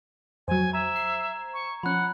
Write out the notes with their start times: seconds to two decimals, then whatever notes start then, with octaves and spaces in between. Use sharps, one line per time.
0.48 F2 F#3 C5 G#5
0.73 E5 A#5 G#6
0.96 C7
1.54 C#6
1.83 F3 C#4 F#5 B5 F#6